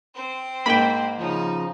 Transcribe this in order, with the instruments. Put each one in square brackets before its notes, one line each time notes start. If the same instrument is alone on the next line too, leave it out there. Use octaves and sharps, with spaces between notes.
[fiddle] C4 C5
[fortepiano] G#2 G#3 A#3 [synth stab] G5 B5
[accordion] C#3 F3 [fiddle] D#4